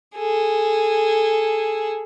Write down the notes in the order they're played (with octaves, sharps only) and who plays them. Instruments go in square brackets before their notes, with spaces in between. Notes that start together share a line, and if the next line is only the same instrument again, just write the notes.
[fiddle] G#4 A4